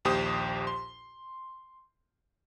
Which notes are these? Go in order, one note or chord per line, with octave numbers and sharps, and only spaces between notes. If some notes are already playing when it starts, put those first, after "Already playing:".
A#1 D#2 G4 C5 D#6
C6